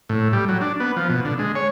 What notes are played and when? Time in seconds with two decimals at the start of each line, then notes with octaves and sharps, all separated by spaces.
0.09 A2
0.33 G3
0.49 F#3
0.61 D4
0.80 B3
0.97 F3
1.10 B2
1.25 D3
1.39 G#3
1.55 C#5